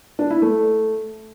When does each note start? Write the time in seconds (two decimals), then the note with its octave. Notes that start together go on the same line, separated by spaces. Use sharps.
0.19 D4
0.30 E4
0.42 A3